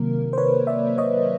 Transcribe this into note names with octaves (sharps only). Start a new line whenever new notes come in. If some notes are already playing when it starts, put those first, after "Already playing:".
Already playing: C3 D#3 F#3 A#3 A#4
C5
B4 C#5
D5 E5
C#5 D#5